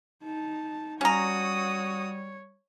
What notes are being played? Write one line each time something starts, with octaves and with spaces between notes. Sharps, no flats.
D#4 A5
G3 C#4 F#4 C#5 A#5 D#6